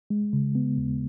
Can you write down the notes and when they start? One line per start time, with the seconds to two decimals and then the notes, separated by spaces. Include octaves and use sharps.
0.10 G#3
0.33 C#3
0.55 B3
0.78 D#2